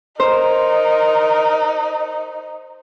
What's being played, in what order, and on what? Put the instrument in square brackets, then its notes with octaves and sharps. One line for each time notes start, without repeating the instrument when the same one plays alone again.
[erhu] D#4 [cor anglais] A#4 [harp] C5